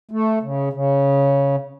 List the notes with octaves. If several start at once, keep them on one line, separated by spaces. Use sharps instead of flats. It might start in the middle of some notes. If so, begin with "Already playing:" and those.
A3
C#3
C#3